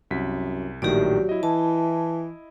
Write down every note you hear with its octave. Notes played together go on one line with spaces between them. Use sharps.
C2 F#2 B6
A#1 A2 D#3 F#3 G4 D5
E4 D#5
E3 A5